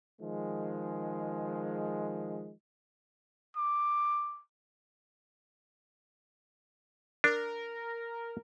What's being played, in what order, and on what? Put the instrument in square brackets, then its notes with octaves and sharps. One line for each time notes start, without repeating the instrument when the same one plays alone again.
[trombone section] D#3 F3 G#3
[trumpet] D6
[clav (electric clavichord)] D4 [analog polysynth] A#4